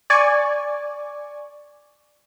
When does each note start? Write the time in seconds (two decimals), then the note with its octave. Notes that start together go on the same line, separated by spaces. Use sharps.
0.10 D5 G#5 C#6